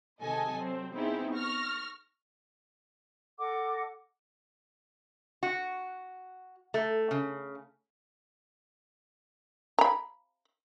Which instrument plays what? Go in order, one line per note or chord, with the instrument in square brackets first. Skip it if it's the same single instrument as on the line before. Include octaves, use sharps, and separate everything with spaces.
[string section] C3 D#3 G#3 A4 D#5 G#5
F#3 C4
B3 C4 D#4 E4 G4 G#4
C#6 F6 A#6
[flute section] A4 D#5 F#5 D6
[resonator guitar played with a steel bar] F#4
A3
C#3
[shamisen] A#5 B5